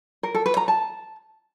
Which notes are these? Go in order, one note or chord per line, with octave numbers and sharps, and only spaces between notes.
A#4
A4
B4
A#5
A5